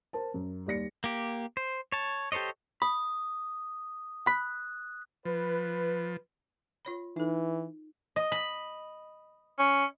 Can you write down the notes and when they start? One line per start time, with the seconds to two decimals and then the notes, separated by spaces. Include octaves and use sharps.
0.13 A#4 C5 A5
0.34 F#2
0.66 D#2 G3 D5 A#6 C#7
1.04 A#3 G4
1.57 C5
1.92 C#5 A5
2.32 G4 A4 C5 C#5 D#5
2.82 B5 D#6
4.27 B5 F#6
5.25 F3 B4
6.85 F4 C#5 B5
7.16 E3 D#4 A4
8.16 D#5
8.32 B5
9.58 C#4